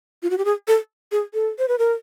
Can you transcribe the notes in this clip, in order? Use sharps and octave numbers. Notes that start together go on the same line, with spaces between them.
F4
F#4
G4
G#4
A4
G#4
A4
C5
B4
A#4